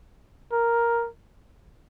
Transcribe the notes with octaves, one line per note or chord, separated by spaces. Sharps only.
A#4